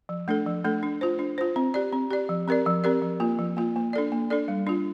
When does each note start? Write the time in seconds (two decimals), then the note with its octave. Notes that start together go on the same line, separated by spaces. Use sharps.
0.09 F3
0.28 A3 D4 A4
0.47 F3
0.64 A3 D4 A4
0.83 D4
1.01 F4 C5
1.19 D4
1.38 F4 C5
1.56 C4
1.74 G4 D5
1.92 C4
2.10 G4 D5
2.29 F3
2.48 C4 G4 A#4 D5
2.66 F3
2.84 C4 G4 A#4 D5
3.02 F3
3.20 A#3 F4
3.39 F3
3.57 A#3 F4
3.76 A#3
3.93 D4 A4 D5
4.12 A#3
4.30 D4 A4 D5
4.48 G3
4.67 D4 F4